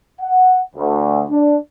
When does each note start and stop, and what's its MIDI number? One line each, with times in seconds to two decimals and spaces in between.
0.20 0.59 78
0.76 1.24 38
1.30 1.56 62